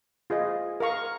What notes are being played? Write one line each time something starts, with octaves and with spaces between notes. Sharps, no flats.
F4 G#4 D#5
A#4 F5 A#5 C#6